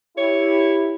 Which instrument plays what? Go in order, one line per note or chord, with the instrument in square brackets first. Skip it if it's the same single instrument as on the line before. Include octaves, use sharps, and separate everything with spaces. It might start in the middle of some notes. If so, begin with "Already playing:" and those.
[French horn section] E4 G4 [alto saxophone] C#5